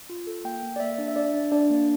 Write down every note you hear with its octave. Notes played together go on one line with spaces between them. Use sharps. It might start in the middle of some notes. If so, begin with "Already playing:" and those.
F4
A4
A#3 G5
A#3
D5
A#3 E5
D4
E5
D4 D5
D4
D4 D5
A#3